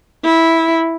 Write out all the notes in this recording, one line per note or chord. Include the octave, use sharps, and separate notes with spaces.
E4